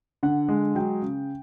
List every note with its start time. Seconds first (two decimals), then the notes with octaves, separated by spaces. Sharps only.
0.23 D3 F#5
0.49 G#3
0.75 F#3 G5
1.02 C#3